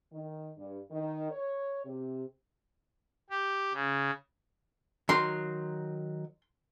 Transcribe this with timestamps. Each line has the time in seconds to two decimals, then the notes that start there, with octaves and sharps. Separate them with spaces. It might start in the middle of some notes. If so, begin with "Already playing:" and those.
0.13 D#3
0.57 G2
0.91 D#3
1.31 C#5
1.85 C3
3.30 G4
3.73 C#3
5.09 D#3 F#3 C6